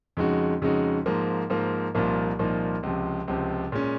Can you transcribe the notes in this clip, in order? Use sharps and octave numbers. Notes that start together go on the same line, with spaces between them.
F2 C#3 G#3 D#4 F#4
F2 C#3 G#3 D#4 F#4
G#2 F3 A#3
G#2 F3 A#3
C2 A#2 F3 A#3 D#4
C2 A#2 F3 A#3 D#4
C#2 C3 F3
C#2 C3 F3
A#2 G#3 C#4